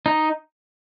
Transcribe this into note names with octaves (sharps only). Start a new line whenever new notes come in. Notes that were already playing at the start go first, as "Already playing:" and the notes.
D#4